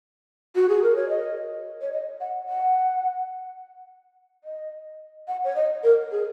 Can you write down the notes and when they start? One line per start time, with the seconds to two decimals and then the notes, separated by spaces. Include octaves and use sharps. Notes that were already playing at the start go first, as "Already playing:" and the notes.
0.55 F#4
0.69 G#4
0.83 A#4
0.96 C#5
1.09 D#5
1.82 C#5
1.92 D#5
2.20 F#5
2.49 F#5
4.44 D#5
5.28 F#5
5.44 C#5
5.55 D#5
5.83 A#4
6.11 G#4